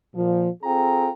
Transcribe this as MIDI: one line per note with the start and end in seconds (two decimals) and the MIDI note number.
0.15 0.48 46
0.15 0.48 53
0.63 1.08 60
0.63 1.08 65
0.63 1.08 68
0.63 1.08 69
0.63 1.08 79
0.63 1.08 82